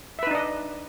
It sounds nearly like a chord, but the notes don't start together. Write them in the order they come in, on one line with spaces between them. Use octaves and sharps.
E5 B4 D#4 D4 D#5